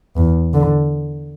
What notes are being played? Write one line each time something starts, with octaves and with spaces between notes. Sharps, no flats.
E2
D3